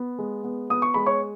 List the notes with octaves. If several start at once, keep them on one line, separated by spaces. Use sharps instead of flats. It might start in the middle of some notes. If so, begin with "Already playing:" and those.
Already playing: B3
G#3
B3
B3 D#6
C#6
G#3 B5
C#5 C#6